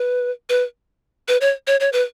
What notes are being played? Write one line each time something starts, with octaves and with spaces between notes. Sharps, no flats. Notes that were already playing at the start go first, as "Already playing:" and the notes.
Already playing: B4
B4
B4
C#5
C#5
C#5
B4